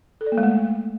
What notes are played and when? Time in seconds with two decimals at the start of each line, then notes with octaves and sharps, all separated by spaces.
0.21 A4
0.26 D5
0.32 A#3
0.38 G#3
0.43 A3